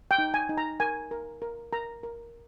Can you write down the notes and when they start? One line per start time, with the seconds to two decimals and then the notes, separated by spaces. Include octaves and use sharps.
0.11 G5
0.18 D#4
0.34 G#5
0.49 D#4
0.57 A#5
0.80 A#4 G#5
1.11 A#4
1.42 A#4
1.72 A#4 A#5
2.03 A#4